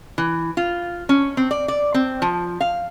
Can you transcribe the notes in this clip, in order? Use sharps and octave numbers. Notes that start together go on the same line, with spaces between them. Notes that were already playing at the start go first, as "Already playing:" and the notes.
E3
F4
C#4
C4
D5
D5
C4
F3
F5